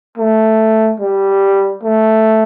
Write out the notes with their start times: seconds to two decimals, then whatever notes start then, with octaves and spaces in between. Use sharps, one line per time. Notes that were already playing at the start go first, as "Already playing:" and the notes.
0.18 A3
1.00 G3
1.83 A3